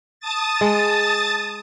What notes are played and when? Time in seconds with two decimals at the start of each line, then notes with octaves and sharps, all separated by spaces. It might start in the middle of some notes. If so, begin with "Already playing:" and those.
0.20 A5 D#6 A6
0.61 G#3